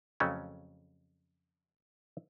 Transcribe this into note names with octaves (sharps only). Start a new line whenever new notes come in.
F2 C#3 F#3 A3 C#4